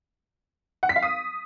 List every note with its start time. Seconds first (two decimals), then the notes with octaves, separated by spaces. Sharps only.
0.83 F#5
0.89 B6
0.96 F5
1.02 D#6